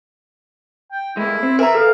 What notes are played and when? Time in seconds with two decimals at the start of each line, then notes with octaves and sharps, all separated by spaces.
0.91 G5
1.17 G#3 A#3 E4
1.43 C4
1.59 A#4 B4 E5 G#5 A#5
1.75 A4 F5